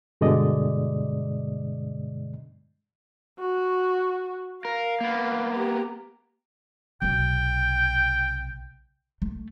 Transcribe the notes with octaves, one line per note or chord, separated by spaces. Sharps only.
G2 B2 D3 G#3 D5 D#5
F#4
A#4 F5
A#3 B3
G4 A#5
B1 C3 G5
A3